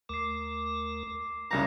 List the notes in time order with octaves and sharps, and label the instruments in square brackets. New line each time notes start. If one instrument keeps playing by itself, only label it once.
[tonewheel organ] D#2 A3 A#4 [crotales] D6 C7
[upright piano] F#1 C2 C#3 [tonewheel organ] F#4 A5 [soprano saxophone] A#5